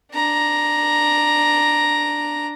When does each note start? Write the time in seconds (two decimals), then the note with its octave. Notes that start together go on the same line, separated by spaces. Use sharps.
0.14 D4 A#5